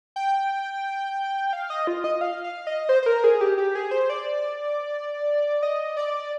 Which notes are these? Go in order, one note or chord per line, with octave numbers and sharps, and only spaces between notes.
G5
F5
D#5
F4
D#5
F5
F5
D#5
C5
C5
A#4
G#4
G4
G4
G#4
C5
D5
D#5
D5